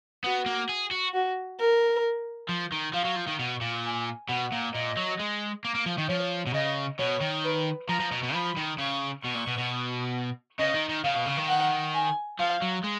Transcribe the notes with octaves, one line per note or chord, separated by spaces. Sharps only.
B3 F#4
A#3
G#4
F#4
F#4
A#4
F3
D#3
F3 F5
F#3
F3
D#3
B2
A#2
G#5
B2 F#5
A#2
A#2 D#5
F#3
G#3
A#3
A#3
F3
D#3
F3 C#5
B2
C#3 D#5
B2 C#5
D#3
B4
F3 A#5
F3
B2
B2
F3 B5
D#3
C#3 C#6
B2 C#6
A#2
B2
B2
C#3 D#5
D#3
D#3
C#3 F5
B2
C#3
D#3
F#5
G#5
F3 F5
F#3
G#3